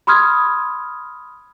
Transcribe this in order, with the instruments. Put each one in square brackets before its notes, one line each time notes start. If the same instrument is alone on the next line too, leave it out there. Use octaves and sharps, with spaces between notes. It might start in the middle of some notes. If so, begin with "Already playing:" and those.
[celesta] B5 C6 D#6 F6 G#6